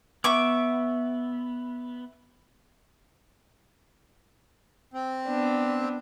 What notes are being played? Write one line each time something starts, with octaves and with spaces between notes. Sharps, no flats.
B3 E5 C#6 D6
C4
B3 D4